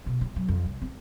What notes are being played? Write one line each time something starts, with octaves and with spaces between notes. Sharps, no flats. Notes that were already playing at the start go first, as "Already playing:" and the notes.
B2
F3
F#3
F2
C2
C4